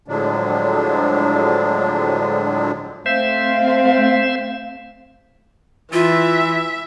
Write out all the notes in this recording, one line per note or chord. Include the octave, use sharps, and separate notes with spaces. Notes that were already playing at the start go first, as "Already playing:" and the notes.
A2 D3 F3 F#3 G#3 D4
A3 C4 C5 E5 F5
E3 F4 E5